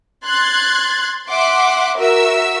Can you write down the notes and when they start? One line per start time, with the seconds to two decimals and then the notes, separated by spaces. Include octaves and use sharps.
0.25 C6 F#6 G#6 A6
1.30 E5 F#5 C6 D6
1.96 F#4 A#4 E5 E6